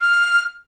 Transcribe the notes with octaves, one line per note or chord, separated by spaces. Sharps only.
F6